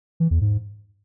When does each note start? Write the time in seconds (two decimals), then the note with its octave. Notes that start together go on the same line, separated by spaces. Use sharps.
0.20 E3
0.31 E2
0.41 G#2